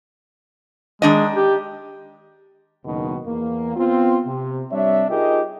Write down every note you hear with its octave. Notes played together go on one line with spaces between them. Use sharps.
D#3 G#3 D4 D#5
G4
F#1 B2 D#3
E2 A#3
B3 C4 F4
C3
G3 C4 D4 C#5 E5
D#4 F4 G4 G#4 A#4 D#5